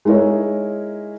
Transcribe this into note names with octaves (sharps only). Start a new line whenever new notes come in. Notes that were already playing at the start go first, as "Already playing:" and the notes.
G#3 D#4 E4 A#4 C#5